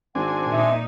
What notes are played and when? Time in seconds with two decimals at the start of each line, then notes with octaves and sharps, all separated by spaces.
0.15 G#1 C4 D4 F#5 G#5
0.50 A#2 D#4 E5